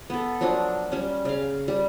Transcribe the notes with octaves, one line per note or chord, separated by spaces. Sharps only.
B3 A4
F3 F#3 A#3 D4
G3 C#4
C#3 F5
G3